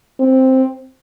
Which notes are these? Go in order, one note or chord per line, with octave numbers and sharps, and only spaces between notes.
C4